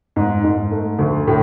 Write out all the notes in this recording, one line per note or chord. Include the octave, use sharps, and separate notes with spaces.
G#2
G#2
A3
D2
A2